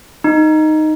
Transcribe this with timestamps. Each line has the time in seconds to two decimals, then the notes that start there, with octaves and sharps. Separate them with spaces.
0.24 D#4